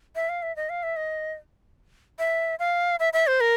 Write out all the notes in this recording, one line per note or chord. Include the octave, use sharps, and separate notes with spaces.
E5
F5
E5
D#5
F5
E5
D#5
E5
F5
E5
E5
C5
A#4